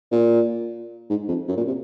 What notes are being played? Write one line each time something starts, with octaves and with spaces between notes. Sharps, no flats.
A#2
G#2
F2
F#2
A#2
C3